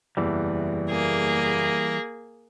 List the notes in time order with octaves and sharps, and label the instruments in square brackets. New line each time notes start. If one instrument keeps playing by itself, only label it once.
[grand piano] F#1 E2 [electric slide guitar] E3 G3
[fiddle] A#3 G#4